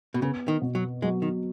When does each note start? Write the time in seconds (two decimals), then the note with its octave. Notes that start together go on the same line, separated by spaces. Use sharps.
0.14 B2
0.22 C#3 B3
0.48 D#3
0.62 B2
0.75 F#3
1.02 F#3 G#3
1.22 D#3